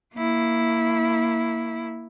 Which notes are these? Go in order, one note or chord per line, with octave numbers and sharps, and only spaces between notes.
A#3 E4